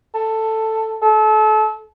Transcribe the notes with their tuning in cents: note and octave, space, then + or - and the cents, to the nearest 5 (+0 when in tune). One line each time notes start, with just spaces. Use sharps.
A4 +10
A4 -30